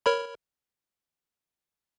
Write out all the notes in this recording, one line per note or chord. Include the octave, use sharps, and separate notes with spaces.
A#4 C#5 B5